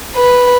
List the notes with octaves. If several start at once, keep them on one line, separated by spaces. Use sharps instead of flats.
B4